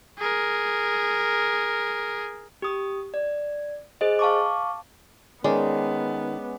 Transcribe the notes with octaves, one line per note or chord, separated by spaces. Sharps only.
G#4 A#4
G4 D#6
D5
G#4 C5 D#5
F5 A5 C#6 D6
D#3 G#3 B3 C#4 D5